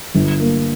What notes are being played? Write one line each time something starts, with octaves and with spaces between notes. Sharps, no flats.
G1
A#3